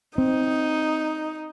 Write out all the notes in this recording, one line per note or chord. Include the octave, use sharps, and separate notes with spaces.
C4 D#4